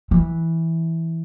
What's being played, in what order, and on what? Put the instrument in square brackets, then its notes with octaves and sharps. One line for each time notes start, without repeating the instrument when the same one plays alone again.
[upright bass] E3